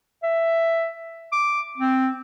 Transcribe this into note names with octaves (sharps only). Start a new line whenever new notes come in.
E5
D6
C4